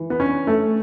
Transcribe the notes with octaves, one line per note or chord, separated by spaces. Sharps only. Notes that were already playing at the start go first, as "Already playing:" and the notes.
Already playing: E3
B3
C#4 D4
A3 A4